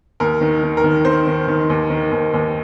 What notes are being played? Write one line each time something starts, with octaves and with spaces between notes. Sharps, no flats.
D#2 A#4
D#3
D#3
A#4
D#3
D#3 C5
D#3
D#3
D#2
D#3
D#2
D#2